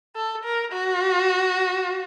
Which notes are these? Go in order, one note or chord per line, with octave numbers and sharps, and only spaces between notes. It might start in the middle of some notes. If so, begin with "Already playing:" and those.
A4
A#4
F#4